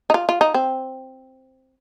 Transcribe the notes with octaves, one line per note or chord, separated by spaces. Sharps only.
D#4
F4
F4
D#4
C4